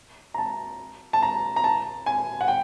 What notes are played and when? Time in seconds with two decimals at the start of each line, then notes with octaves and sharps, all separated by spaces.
0.34 A#5
0.38 A5
1.13 A5
1.22 A#5
1.56 A#5
1.64 A5
2.06 G#5
2.41 F#5
2.48 G5